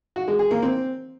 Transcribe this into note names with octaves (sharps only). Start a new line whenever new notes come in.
F#4
G#3
G#4
A#3
C4